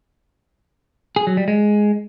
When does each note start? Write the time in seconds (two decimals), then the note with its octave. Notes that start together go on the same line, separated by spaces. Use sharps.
1.16 G#4
1.27 F#3
1.37 G3
1.48 G#3